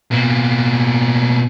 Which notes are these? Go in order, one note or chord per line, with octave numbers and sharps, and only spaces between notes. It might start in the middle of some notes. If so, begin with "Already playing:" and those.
B2 A#3